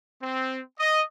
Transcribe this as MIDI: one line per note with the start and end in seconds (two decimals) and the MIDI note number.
0.22 0.60 60
0.80 1.03 75